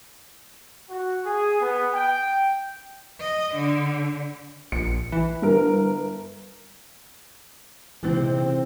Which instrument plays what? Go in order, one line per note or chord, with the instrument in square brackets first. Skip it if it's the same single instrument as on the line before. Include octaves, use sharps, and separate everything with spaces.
[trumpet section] F#4
G#4
B3
G5
[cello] D#5
D3
[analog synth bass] A#1 [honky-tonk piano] C#7
[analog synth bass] E3
[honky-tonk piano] G1 A#4
[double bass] C3 C4 [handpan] E3 G#3 D#4